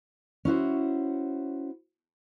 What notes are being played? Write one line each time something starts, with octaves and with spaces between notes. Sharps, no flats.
C#4 E4 F#4 C5